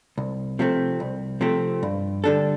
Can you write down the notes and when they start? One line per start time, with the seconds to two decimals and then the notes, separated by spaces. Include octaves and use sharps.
0.18 C2
0.59 C3 F3 A3 C4
1.00 C2
1.41 C3 F3 A3 C4
1.83 G2
2.24 D3 G3 D4 A4